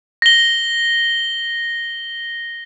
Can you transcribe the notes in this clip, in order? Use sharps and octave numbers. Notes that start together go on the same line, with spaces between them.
A#6 G7